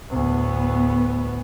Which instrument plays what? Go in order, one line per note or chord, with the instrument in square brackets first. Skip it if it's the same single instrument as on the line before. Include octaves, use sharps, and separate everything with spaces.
[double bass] D2 A2 [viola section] B3